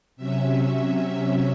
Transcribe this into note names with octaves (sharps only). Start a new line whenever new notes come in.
C3 F#3 C#4 E5